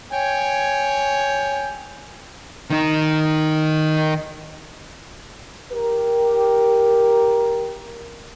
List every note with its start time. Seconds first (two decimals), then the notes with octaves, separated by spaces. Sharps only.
0.12 C#5 G5 G#5
2.70 D#3 D#4
5.72 G4 A#4